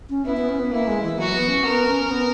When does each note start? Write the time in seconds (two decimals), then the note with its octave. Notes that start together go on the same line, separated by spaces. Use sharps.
0.10 C#4
0.25 B3 E4
0.37 B3
0.49 C#4
0.60 B3
0.72 A#3 E4
0.87 G#3
1.03 E3
1.18 F#3 F#4
1.33 B3
1.48 C#4
1.65 B3 A#4
1.87 C#4
2.11 B3